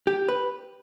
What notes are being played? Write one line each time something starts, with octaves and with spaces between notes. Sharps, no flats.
G4
B4